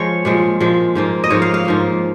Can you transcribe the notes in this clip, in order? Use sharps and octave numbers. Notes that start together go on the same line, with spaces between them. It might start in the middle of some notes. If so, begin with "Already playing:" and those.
Already playing: F3 G#3 C#5
A#2 F3 G#3
A#2 F3 G#3
G#2 F3 A#3
D#5
G#2 F3 A#3 C#5
F5
F5
G#2 F3 A#3